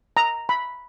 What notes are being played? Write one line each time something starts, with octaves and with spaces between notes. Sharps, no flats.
A#5
B5